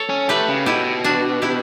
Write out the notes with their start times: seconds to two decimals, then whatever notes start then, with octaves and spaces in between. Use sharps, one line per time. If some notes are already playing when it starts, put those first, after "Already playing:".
Already playing: A4 C#5
0.09 C#4
0.29 A3 G4 B4
0.48 C#3
0.66 B2 E4 G4
1.04 D4 F#4
1.42 E4 G4